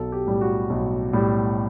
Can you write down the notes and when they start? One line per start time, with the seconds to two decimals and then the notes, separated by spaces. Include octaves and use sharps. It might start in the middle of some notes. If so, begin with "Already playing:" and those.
Already playing: B1 A4
0.12 G4
0.27 A2 G3
0.41 F#4
0.70 B1
1.13 A2 G3